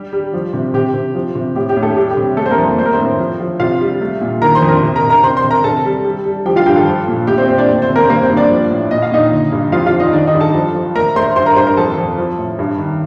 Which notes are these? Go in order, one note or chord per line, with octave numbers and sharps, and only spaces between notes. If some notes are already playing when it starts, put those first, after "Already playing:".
Already playing: G3 G4
G3
F3
C3
C3 G4
C3
F3
C3
A2 G4
G4
A2
A3 A4
G3 G4
G4
C3
G3 A3 A4
C5
A#3 A#4
F2
A3 C5
A#4
C4 C5
A2
F3
F3
C3 F4 F5
G3
A3
A#2
D#3 A#4 A#5
C5 C6
F2
A#4 A#5
C3
A#4 A#5
C3
A#4 A#5
C3 C5 C6
C5 C6
C3
A#4 A#5
C3 A4 A5
G3
G3
G3
F3 G4 G5
F4 F5
G2 G4 G5
A4 A5
F3
A#2
A3 G4 G5
C4 C5
A#2 C4 C5
D4 D5
A3
C4 C5
C3
A#3 A#4
C5
G2 A#3 A#4
C4 C5
G2
D4 D5
F3
A2
A#2 D#5
F5
A#2 D#4 D#5
D3
G2
F2 F4 F5
F4 F5
F2
D#4 D#5
D#3 D4 D5
D#4 D#5
G2
A4 A5
F3
F3
A3 A#4 A#5
A3 C5 C6
G2 C5 C6
A#4 A#5
G2 C5 C6
A#4 A#5
F2 A4 A5
F2
F3
A2
G2
D#3